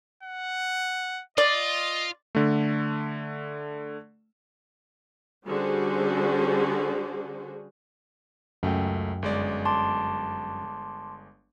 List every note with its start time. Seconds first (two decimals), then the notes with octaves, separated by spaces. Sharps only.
0.23 F#5
1.38 F4 D5 D#5
2.35 D3 A3
5.45 D3 G3 C#4 F#4 G#4 C5
8.63 C#2 F#2 A3 G5
9.22 G1 G#3 D5
9.65 A5 C6 D6